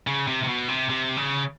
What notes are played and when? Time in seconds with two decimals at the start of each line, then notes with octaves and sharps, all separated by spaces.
0.07 C#3
0.27 C3
0.43 C3
0.48 B2
0.68 C3
0.89 C3
1.17 C#3